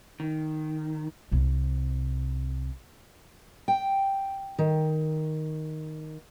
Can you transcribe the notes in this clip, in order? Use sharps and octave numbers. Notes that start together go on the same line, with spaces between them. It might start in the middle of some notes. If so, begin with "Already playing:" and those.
D#3
C2 C3
G5
D#3